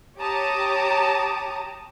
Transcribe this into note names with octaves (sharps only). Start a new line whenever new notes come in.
G4 C#5 A5 A#5 D6 D#6